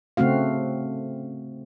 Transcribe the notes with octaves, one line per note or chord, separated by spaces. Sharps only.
C#3 A3 C4 F#4 F5